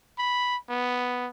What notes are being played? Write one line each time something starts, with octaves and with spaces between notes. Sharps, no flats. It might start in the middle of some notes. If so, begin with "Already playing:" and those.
B5
B3